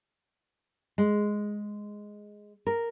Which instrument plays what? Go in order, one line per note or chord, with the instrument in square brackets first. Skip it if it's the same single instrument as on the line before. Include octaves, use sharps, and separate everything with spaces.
[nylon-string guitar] G#3
A#4